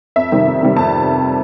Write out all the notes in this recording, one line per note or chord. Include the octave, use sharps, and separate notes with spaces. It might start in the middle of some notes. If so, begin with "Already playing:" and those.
F2 E5
C3 D#3 G3 C4
F2
C3 D#3 G3 C4
F2 A5